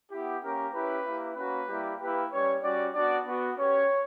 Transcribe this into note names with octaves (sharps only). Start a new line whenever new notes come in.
B3 E4 G4
A#3 C#4 G4 A#4
C#4 E4 G4 B4
A#3 E4 G4
A#3 C#4 F#4 B4
G3 A#3 E4 G4
A#3 E4 G4 B4
G3 C#4 G4 C#5
G3 C#4 F#4 D5
B3 D4 F#4 D5
B3 F#4
C#4 G4 C#5